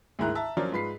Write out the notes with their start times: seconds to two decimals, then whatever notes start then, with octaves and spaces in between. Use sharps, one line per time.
0.19 D2 G#2 D#3 E4 A#5 F#6
0.35 E5 A5 A#5
0.57 F3 F#3 C#4 F4 A#4 D5
0.72 G#2 F4 B4 B6 C7